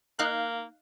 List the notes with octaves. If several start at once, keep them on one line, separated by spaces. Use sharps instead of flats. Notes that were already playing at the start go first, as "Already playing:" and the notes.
A#3 D#4 F5 F#6